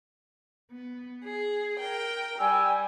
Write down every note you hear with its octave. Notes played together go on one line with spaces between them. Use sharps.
B3
G#4
A#4 G5
G3 G5 G#5 E6